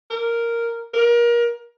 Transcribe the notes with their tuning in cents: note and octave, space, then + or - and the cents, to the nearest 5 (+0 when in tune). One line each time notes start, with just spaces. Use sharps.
A#4 -5
A#4 +30